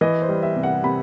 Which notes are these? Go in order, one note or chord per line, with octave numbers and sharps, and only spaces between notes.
E3 D#5
C5
G3
E5
C3
F#5
C3 B5